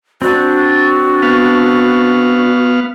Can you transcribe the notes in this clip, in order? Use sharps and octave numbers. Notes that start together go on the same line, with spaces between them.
C4 D4 F#4
B3 F5